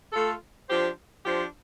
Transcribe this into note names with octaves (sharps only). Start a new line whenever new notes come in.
A3 F4 A4
F3 D4 G4 C5
F3 D4 G4 C5